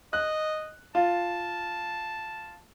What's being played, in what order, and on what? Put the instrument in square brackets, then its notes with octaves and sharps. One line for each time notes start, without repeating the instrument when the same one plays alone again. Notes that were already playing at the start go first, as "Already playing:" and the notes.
[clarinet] D#5 [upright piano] F#6
[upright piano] F4 [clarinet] A5